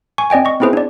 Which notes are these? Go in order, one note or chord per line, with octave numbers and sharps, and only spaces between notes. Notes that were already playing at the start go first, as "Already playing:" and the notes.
G#5 C#6
C4 D5 D#5 G5 G#5
D#5 C#6
B3 C4 E4 G#4 B4 C5
D4 D5